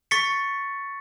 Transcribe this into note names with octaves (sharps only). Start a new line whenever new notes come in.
C#6 A6 B6 C#7